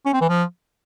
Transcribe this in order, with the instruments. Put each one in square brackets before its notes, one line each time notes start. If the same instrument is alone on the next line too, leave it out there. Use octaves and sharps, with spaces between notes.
[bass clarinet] C#4
C4
E3
F3